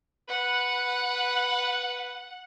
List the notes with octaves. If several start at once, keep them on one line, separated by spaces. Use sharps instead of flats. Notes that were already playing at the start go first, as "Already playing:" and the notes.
B4 F#5